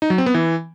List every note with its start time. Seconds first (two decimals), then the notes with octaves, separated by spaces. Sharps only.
0.02 D#4
0.10 F#3
0.18 C4
0.26 B3
0.35 E3